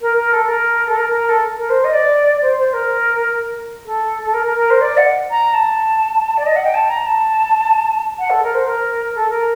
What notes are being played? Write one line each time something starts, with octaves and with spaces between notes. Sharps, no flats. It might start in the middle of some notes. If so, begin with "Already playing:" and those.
A#4
A#4
A4
A#4
A4
A#4
A#4
A4
A#4
C5
D#5
D5
C5
C5
A#4
A4
A4
A#4
A#4
A#4
C5
D5
F#5
A#5
A5
D5
D#5
F#5
G5
A5
A#5
A5
F#5
A4
A#4
C5
A#4
A4
A#4